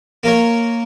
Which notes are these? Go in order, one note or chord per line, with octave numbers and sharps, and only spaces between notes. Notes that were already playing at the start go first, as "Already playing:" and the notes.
A#3 A#4 C#5